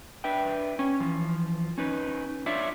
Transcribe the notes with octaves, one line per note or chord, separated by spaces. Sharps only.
D4 B4 E5 G5
C#4
E3 F3
C#4 D#4 B4
D4 F4 C#5 E5